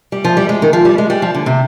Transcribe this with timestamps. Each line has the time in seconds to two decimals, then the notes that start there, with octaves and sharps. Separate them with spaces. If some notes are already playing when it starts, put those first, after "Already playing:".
0.12 G3
0.25 F3
0.37 G3
0.49 G#3
0.62 D#3
0.73 F3
0.85 G3
0.98 G#3
1.10 G3
1.22 F3
1.34 D3
1.46 C3